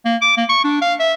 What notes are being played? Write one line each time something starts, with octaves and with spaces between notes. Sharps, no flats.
A#3
D6
A#3
C#6
D4
F5
E5